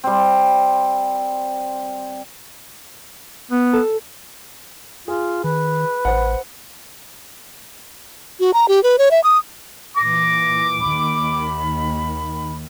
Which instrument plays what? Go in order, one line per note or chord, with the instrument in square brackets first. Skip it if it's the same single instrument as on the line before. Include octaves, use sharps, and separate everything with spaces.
[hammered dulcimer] G3 C4
[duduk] B3
[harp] A4
[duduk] F4 [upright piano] G#4
[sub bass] D#3 [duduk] B4
[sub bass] A1 [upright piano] C5 F#5
[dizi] F#4
A#5
G4
B4
C#5
E5
D#6
[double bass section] A#2 E3 [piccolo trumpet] D6 [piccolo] A#6
[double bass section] D#2 D#3 [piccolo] B5